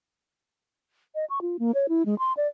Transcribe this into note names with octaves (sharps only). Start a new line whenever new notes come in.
D#5
C#6
F4
A#3
C#5
E4
G#3
C6
D5